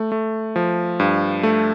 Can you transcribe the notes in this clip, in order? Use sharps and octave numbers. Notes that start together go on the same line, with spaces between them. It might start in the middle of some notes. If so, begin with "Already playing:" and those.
Already playing: A3
A3
F3
G2
A3